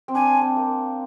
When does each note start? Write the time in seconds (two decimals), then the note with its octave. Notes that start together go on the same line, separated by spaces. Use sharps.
0.08 C4
0.14 D4 G#5
0.42 C4
0.56 A#3